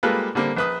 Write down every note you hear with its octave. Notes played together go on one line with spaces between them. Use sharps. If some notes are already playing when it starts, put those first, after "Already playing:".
G3 G#3 A#3 F4 A4 B4
D3 G3 A#3 C4
A#1 B4 D#6